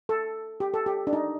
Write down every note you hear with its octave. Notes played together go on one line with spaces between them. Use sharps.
A4
G4
A4
G4
D4
D#4